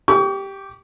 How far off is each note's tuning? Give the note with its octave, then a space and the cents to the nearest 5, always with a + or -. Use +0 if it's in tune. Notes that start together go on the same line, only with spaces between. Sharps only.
G4 +0 C#6 +40